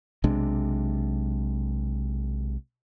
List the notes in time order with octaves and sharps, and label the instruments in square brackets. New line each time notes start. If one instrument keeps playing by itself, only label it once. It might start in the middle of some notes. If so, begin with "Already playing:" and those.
[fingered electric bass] B1 C3 G#3 D4